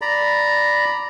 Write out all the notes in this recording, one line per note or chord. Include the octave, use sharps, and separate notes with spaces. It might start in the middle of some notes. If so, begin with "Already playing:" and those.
D5 A#5 B5